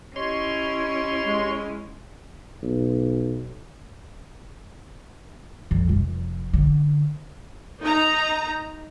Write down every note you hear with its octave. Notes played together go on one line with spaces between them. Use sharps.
C#4 E4 G4 C#5 D#5 C6
G#3
B1
F2
F1
D3
D#4 A#5